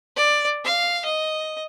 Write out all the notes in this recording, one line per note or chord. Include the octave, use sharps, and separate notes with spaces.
D5
F5
D#5